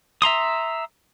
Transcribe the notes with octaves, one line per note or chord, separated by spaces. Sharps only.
E5 A#5 C6 D#6